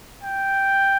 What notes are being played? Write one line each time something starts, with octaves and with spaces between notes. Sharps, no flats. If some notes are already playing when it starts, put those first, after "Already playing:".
G5